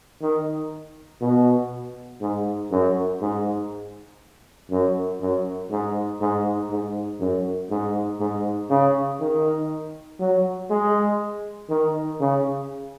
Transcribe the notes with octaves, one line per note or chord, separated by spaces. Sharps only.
D#3
B2
G#2
F#2
G#2
F#2
F#2
G#2
G#2
G#2
F#2
G#2
G#2
C#3
D#3
F#3
G#3
D#3
C#3